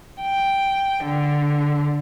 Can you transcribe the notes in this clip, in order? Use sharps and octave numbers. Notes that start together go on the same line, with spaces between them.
G5
D3